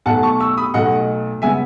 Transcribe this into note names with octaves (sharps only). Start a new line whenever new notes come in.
B1 B2 A3 F#5 A5
A5 C#6
C#6 E6
B5 D#6
B1 B2 A3 D#5 F#5
C#3 G#3 B3 E5 G#5